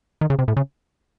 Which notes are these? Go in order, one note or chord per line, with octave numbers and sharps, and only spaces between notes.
D#3
C#3
C3
A2
C#3